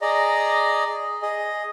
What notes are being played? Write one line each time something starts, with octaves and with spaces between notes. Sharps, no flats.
G#4 D5 D#5 A#5
G#4 D#5